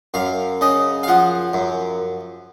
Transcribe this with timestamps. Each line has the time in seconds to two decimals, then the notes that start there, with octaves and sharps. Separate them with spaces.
0.14 F#2 F5
0.61 C#3 D#5
1.03 F5
1.08 F3 F#5
1.53 F#2